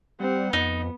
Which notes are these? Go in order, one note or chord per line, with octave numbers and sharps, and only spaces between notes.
G3 C4 F#5
F2 B3 D#4